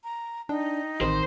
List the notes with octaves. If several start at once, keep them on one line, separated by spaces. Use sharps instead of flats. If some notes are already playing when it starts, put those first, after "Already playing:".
A#5
D4 D#4 G5
A1 D#3 C4 C5 B5